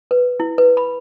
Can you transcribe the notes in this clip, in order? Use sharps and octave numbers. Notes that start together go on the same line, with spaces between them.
B4
E4
B4
B5